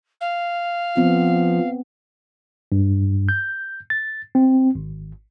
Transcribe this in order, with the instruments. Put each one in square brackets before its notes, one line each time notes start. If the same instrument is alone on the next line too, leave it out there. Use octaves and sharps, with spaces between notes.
[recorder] F5
[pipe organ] F3 [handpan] B3 C4
[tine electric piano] G2
G6
A6
C4
G#1